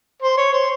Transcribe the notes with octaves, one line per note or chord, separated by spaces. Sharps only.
C5
C#5
C5